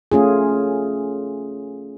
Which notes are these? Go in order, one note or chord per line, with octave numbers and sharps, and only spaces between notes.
A3 C#4 F4 G#4